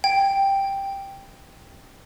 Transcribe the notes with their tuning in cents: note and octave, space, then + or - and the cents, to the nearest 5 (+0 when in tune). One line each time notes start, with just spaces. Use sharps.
G5 +5